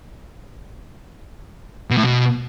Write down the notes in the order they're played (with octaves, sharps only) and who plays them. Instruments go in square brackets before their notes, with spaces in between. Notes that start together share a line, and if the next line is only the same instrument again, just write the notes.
[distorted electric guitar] B2
A2
B2